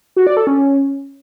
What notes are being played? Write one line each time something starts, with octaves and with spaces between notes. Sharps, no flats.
F#4
D5
A4
C#4